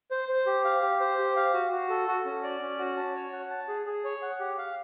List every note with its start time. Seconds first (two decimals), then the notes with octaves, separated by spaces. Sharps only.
0.11 C5
0.29 C5
0.46 G4
0.65 F5
0.82 G4
1.00 C5
1.18 G4
1.36 F5
1.54 F#4
1.72 F#4
1.89 A4
2.08 F#4
2.25 C#4
2.43 D5
2.61 C#4
2.79 F#4
2.97 A5
3.15 C#5
3.33 F#5
3.50 A5
3.68 G#4
3.86 G#4
4.04 C#5
4.22 F#5
4.40 G4
4.58 F5